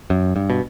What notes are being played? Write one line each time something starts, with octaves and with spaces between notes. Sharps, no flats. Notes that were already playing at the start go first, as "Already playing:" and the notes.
F#2
G2
B2